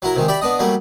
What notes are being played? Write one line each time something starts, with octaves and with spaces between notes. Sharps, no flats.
F#3 E4 A#4
C3 D#3 G#3
G4 D5 E5 B5
B3 D4 D#5
F#3 G3 A3 A#3